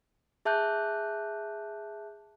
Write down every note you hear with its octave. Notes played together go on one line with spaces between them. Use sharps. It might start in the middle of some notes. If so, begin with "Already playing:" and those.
G#4 E5 A5 F#6 G6